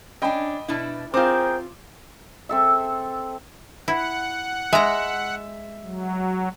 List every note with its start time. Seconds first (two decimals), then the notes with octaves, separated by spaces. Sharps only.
0.22 C#4 D4 D#5 G5 B5
0.68 B2 D4 E4
1.14 C4 F4 G#4 A#4 C5 G5 D6
2.49 C4 A4 E5
3.88 E4 F#5
4.73 G#3 E5 A#5
5.83 F#3